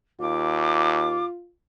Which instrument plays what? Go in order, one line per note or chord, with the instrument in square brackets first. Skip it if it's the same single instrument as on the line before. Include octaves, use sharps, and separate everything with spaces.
[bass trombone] D#2 [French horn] F4 [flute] D6